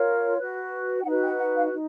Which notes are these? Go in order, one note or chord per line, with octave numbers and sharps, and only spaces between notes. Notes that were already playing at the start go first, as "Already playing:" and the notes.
Already playing: F4 A#4 C#5
F#4 B4
G5
D#4 F#4 B4 F#5
G5
F#5
F5
D#4